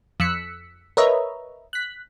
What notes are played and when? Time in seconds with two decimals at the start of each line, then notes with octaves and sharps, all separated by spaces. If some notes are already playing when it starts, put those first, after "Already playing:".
0.20 F2 E6 F#6 B6 C#7
0.97 A#4 B4 C#5 D#5 E5 A#5
1.73 F#6 B6